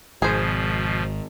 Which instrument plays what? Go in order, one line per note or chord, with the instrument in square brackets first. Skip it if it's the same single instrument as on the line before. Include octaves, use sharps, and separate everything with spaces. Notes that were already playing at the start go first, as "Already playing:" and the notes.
[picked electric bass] G#1 [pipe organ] B2 F3 [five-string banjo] G#4 C5